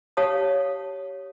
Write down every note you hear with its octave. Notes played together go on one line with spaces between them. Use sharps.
G4 C#5 F5 A5 D#6